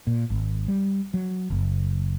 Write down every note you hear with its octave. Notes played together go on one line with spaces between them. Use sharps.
A#2
G#1
G3
F#3
F#1